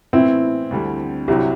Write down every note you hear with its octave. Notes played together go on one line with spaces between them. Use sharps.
A2 E3 B3 C4 E4
D2 D3 G3
C2 C3 F#3 E4 G4